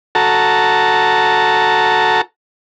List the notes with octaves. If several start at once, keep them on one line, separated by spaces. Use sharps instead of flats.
F#4 A4 A5 A#5